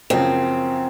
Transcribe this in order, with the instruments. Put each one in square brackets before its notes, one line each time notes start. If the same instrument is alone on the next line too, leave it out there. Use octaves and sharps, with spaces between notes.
[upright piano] F#2 C#3 F3 A#3 C#4 [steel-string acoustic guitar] C4